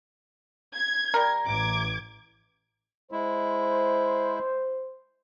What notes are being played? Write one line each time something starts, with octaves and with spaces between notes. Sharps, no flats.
G#6
G3 A#4
A1 D6 G#6
G#3 E4 C5